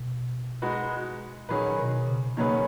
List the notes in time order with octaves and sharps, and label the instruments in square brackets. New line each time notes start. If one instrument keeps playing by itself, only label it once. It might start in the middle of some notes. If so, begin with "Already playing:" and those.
Already playing: [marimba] B2
[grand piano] G#3 D#4 F#4 B4
[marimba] A#2 [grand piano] D#3 F#3 C#4 G#4 B4
[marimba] B2
C#3
[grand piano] D#3 F#3 C#4 G#4 B4 [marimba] A#3